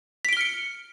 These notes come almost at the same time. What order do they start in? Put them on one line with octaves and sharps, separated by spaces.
B6 D7 G7 F6 C#7